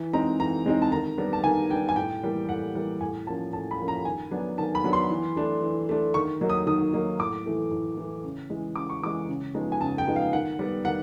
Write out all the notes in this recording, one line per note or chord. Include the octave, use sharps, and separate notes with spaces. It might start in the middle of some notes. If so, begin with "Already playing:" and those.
Already playing: E3
G#3 C4 D#4 A#5
E3 A#5
G#3 C4 D#4
A5
D#3 A#5
G3 B3 D4
A5
D#3 G#5
G3 B3 D4 G5
G#5
A2 G5
E3 G3 A#3
A2 F#5
E3 G3 A#3
A2 G#5
F3 A#3 C#4 A5
A2 A5
B5
F3 A#3 C#4
A#5
D#3 G#5
F#3 B3 D4
D#3 A5
B5
F#3 B3 D4
C6
E3
A3 D4
E3
A3 D4
D#3 C#6
F#3 A#3 D#4
D#6
D#3 D#6
F#3 A#3 D#4
A2 D6
E3 A3
A2
E3 A3
C#3
E3 G#3
C#3 D6
C#6
E3 G#3 D6
C#3
F3 G#3 B3 D#4
G#5
C#3 A5
G5
F3 G#3 B3 D#4
F5
D#3 F#5
G3 B3
D#3 F#5